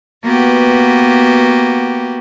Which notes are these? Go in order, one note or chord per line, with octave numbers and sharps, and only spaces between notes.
A#3 B3 F#4 G4 B4